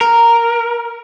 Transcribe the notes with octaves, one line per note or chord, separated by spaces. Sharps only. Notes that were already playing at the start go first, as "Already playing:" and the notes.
A#4